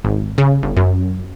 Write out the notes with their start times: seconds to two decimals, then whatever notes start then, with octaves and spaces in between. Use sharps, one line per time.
0.05 G#1
0.38 C#3
0.63 G1
0.77 F#2